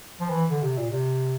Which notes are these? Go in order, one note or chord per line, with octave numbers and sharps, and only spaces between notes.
F3
E3
D3
C3
A#2
C3